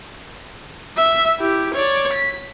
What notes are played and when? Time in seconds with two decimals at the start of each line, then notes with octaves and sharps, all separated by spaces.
0.97 E5
1.39 E4 G4
1.74 C#5 D5
2.12 B6